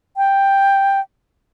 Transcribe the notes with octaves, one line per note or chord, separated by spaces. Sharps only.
G5